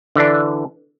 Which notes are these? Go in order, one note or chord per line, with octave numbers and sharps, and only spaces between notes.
D3 E3 D4